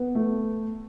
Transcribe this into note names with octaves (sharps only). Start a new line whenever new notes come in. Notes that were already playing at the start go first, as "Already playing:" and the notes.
Already playing: B3
A3